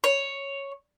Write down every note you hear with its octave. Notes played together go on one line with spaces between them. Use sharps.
C#5